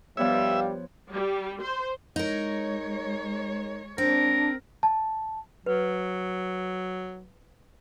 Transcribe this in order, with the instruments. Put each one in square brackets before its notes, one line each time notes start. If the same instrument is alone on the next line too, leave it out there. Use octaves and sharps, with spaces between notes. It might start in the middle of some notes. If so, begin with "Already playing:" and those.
[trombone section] G2 G3 [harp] F3 B3 C#5 [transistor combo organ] E5 [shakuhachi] F5
[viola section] G3
C5
[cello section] G#3 C#5 [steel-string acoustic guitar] D#4 A#4
[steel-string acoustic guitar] C4 [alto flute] D4 [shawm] A#4
[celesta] A5
[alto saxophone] F#3 [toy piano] B4